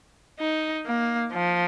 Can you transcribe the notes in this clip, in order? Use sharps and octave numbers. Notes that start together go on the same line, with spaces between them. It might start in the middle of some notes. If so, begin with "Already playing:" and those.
D#4
A#3
F3